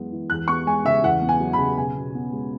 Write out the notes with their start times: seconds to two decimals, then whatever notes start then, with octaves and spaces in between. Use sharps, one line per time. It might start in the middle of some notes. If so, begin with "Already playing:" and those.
Already playing: F#2 E3 G#3 B3
0.12 E3
0.30 E2 F#6
0.48 B3 C#6
0.66 G#3 G#5
0.85 C#3 E5
1.03 E2 F#5
1.21 B3
1.29 G#5
1.40 F#3
1.53 C#3 B5
1.77 B2 G#5
1.96 B2
2.15 B3
2.32 G#3